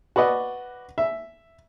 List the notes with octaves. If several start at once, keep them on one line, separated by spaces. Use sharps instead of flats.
F#4 B4 D5 D#5
E5